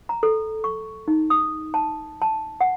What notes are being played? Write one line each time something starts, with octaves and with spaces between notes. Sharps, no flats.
A#5
A4
C#6
D#4
D#6
A5
A5
F#5